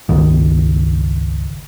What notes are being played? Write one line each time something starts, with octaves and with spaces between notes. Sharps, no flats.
G1 C#2 D#3